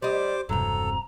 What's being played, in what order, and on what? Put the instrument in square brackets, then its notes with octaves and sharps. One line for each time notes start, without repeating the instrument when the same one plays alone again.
[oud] G3 D#5 [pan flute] G4 [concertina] C5 D6
[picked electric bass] E1 G2 [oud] C3 F#3 [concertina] A4 [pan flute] A#5